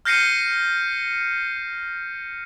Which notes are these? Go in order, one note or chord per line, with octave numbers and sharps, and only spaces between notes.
F6 G6 A#6 C7 C#7 D#7